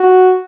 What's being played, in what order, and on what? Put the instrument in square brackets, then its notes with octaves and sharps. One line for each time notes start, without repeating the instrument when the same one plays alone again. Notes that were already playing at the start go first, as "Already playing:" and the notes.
Already playing: [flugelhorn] F#4